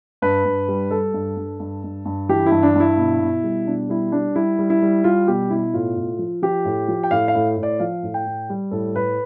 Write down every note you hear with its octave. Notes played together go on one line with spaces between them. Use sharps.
G2 B4
G2
G3
G3 A4
G2
G2
G2
G2
G2
E3 G4
E4
G2
D4
G2 E4
B2
B2
G3
B2 D4
G3 E4
G3 D4
G3 E4
G3
E4
G3
G3 F4
B2 G4
B2 E4
A2 F4
A2
F3
F3 G4
A2
F3
G5
A2 F5
F5
A2
A2
D5
F3 F5
A2
G5
A2
G3
A2 A4
A2 B4